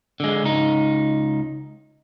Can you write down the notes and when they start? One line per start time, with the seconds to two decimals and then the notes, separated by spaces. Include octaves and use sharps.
0.20 D3 G#3
0.43 C#2 D#4